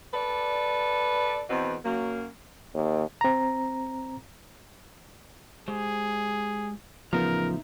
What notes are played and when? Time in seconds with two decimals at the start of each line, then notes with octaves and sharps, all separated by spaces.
0.14 A4 B4 D5
1.50 E2 B2 C4 B4
1.85 F#2 F#3 A#3
2.74 D#2
3.21 C4 A#5
5.68 G#3 G4 G#4 C5
7.13 A1 C#3 F3 B3 D#4 A#4 E5 A#5